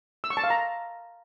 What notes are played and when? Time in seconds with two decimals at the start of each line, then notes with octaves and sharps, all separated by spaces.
0.24 E6
0.30 C#6
0.37 A5
0.44 F5
0.50 A#5